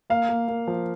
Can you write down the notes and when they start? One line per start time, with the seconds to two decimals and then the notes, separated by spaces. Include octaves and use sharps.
0.10 A#3 F5
0.29 A#3
0.48 A#3
0.68 F3